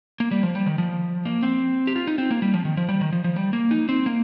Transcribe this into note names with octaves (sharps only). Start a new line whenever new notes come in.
A#3
G3
F3
G3
D#3
F3
A#3
C4
G4
F4
D#4
C4
A#3
G3
F3
D#3
F3
G3
D#3
F3
F3
G3
A#3
D#4
C4
A#3